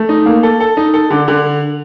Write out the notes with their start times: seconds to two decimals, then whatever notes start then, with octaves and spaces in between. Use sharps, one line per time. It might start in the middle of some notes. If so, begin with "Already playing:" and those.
Already playing: A3
0.09 D#4
0.26 A#3
0.43 A4
0.60 A4
0.77 D#4
0.94 A4
1.10 D3
1.28 D3